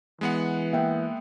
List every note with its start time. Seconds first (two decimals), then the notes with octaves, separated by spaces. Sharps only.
0.21 E3 G#3 B3 F#5
0.72 A#3 E5 G5